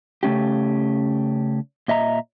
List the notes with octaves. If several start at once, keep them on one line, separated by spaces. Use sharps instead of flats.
C#3 A3 C#4 G4
A#2 D#5 E5 A#5